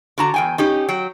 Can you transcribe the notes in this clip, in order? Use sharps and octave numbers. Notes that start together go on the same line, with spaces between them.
D3 F#4 A#5
E2 G5 G#5
C#4 D#4 G4
F#3 G5